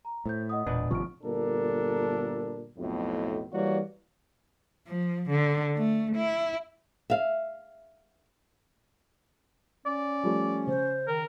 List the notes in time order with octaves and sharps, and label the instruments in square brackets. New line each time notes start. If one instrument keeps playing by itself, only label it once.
[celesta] A#5
[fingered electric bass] A2 [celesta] C5 G6
[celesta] D#5 F#5 D#6
[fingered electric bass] E1 [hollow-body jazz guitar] A#2 D4 B4
[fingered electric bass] G#1 C3 F3 [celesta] C#6 F6 D7
[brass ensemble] G1 A#2 D4 A4 A#4
B1 F2 A2
E3 G3 A#3 F#4 C#5 D5
[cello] F3
D3
A3
E4
[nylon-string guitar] E5 F5
[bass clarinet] C#4 [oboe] D5
[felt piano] F3 G3 A3
[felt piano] C#3 [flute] C5
[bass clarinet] D#3 [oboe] A#4